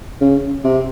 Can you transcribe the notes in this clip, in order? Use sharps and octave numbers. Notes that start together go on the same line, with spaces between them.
C#3
C3